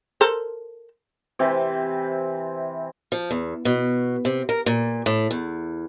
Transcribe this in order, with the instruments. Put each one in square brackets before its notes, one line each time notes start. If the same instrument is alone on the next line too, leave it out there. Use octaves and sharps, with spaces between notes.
[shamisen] A4 A#4 C5
[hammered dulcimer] C3 E3 C4
[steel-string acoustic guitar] F3
E2
B2
C3
A#4
A#2
A2
E2